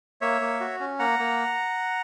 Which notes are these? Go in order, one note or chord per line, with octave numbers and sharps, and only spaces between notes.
A#3 C#5 E5
A#3
F#4
C#4
A#3 F#5 A#5
A#3